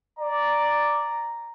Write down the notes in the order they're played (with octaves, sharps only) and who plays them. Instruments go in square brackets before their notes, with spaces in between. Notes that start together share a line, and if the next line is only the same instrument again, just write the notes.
[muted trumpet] D5 [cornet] A#5